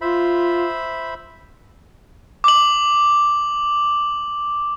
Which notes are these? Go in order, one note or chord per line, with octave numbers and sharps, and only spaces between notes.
F4 C5 E5 B5
D6 F#7